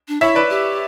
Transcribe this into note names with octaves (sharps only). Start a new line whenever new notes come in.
D4
E4 C#5 E5
B4 D5
G4